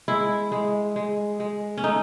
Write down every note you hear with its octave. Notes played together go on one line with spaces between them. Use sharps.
G#3 E4
G#3
G#3
G#3
C#4
A3 D#4